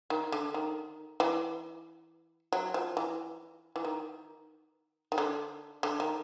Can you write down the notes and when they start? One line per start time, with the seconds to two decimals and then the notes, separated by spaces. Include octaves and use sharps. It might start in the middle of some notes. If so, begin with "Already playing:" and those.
0.10 D#3
0.32 D3
0.54 D#3
1.20 E3
2.52 F#3
2.74 F3
2.97 E3
3.76 E3
3.85 D#3
5.12 D#3
5.18 D3
5.83 D3
6.00 D#3